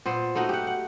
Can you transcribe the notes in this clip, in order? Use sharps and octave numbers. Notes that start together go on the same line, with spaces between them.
A#2 B3 C5
A3 B3 D#4 F#4
G4 F#5
F#5